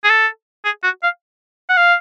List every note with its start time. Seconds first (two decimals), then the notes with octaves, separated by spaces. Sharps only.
0.04 G#4
0.10 A4
0.65 G#4
0.83 F#4
1.03 F5
1.69 F#5
1.77 F5